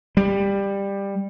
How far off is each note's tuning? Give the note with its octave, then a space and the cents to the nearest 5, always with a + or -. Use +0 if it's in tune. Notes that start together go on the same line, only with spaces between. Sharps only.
G3 +15